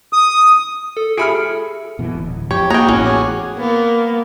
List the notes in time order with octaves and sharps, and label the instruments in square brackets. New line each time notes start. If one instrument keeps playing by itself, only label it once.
[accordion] D#6
[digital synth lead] A4
[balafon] F4 G4 [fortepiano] G#4 B5 F6 [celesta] E5 C#7 D7
[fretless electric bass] B2 E3
D1
[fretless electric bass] F2 [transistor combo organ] G4 [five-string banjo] C#5
[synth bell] A#3 D#6 G#6 [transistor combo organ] F#4 G#4 C#5 [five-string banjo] G5 A#5
[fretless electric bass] A1 A2 B3 [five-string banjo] C#4 [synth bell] E4
[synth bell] G#5 D6
[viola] A#3 [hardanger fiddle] B3